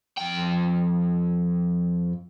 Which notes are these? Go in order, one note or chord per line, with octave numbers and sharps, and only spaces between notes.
F2 G5